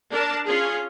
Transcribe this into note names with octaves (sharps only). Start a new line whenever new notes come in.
D4 A#4 A5
C#4 F4 G#4